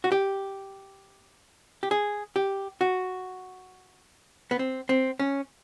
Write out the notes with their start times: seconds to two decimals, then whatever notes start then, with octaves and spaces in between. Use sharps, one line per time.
0.04 F#4
0.12 G4
1.83 G4
1.91 G#4
2.36 G4
2.81 F#4
4.51 B3
4.59 C4
4.89 C4
5.20 C#4